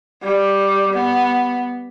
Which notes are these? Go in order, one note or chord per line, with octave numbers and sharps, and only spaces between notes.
G3
B3